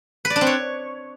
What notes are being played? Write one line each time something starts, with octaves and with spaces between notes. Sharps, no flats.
B4
D5
D4
C4
C#5